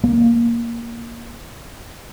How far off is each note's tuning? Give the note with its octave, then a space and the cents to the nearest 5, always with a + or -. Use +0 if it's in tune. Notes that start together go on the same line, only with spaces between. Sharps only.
A#3 +5